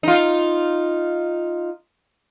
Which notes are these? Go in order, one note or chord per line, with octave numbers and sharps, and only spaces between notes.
D#4 F4